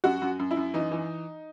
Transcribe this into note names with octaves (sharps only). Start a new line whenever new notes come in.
F#2 F#4
F#2
F#2
E4
F#2
E3 D#4
E3